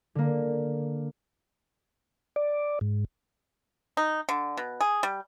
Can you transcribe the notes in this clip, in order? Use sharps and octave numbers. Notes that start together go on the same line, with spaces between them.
D3 A#3
D5
G#2
D#4
D3
B2
G#4
G3